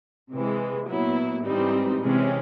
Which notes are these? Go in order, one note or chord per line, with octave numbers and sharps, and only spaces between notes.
C3 E3 G#3
A#2 F#3 B3 E4
G#2 E3 G3 C4 D#4
C3 E3 G#3 C#4